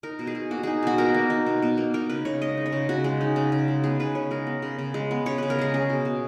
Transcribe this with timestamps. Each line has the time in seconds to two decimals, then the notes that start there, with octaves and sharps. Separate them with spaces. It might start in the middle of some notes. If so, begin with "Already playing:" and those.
0.03 D#4 A#4
0.19 B2
0.27 G#4
0.35 B2
0.51 A#3 F#4
0.63 D#4 G#4
0.82 B2 F#4
0.98 B2 A#4
1.14 A#3
1.30 D#4
1.46 B2
1.62 B2
1.78 A#3
1.94 D#4 A#4
2.09 C#3 B4
2.25 C#3 C#5
2.41 G#3 D#5
2.57 D#4
2.66 C#5
2.72 C#3
2.89 C#3 F#4
3.04 G#3
3.21 D#4
3.36 C#3
3.52 C#3
3.68 G#3
3.83 B3 G#4
4.00 C#3 B4
4.15 C#3 C#5
4.31 G#3 A#4
4.47 B3
4.62 C#3
4.79 C#3
4.94 G#3
5.11 B3
5.26 C#3 C#5
5.38 C#3 B4
5.50 A#4
5.59 G#3 G#4
5.74 C#4 G#4
5.89 B2
6.05 B2